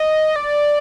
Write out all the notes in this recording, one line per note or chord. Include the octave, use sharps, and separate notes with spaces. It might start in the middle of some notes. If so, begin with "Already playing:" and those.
Already playing: D#5
D5